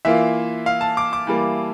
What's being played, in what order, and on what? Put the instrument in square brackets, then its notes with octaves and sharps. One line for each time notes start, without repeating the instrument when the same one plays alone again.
[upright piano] E3 A#3 F4 [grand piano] E5
[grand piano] F5
A5
D6
D6
[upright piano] E3 G3 A#3